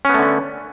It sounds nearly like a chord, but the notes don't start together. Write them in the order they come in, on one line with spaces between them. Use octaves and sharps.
C#4 B3 A3 D3